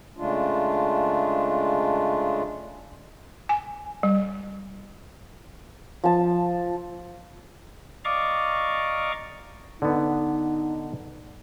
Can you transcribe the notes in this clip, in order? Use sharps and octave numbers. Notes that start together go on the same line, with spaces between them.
C#3 G#3 A3 D4 F4
G#5
G3
F3 A5
D5 D#5 F5 A#5 C#6 D6
D3 B3 D#4